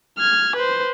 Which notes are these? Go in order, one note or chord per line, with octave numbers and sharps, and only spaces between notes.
F6 G#6
B4 C5